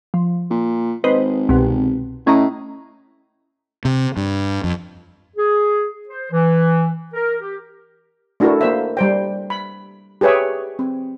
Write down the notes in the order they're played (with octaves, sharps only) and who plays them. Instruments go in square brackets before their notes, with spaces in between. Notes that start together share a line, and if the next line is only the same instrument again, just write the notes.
[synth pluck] F3
[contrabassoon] A#2
[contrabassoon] G#1 [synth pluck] B4 C5 D#5
[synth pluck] C2 B2
[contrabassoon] A2 [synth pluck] C#4 D#5 A#5
[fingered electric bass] C3
G2
F2
[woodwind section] G#4
C5
E3
A#4
G4
[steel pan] A3 D4 E4 F#4 A4 A#4
A#3 C5 E5
G3 C5 G5
B5
G4 G#4 B4 C#5 E5
C4